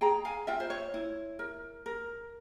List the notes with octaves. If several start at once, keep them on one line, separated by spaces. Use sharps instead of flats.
G#4 G5 A#5
F5 G#5
F4 E5 G5
C5
C#5
E4
A#4
A#4